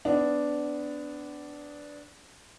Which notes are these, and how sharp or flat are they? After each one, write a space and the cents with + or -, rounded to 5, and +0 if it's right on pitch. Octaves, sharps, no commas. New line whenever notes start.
B3 +25 D4 -5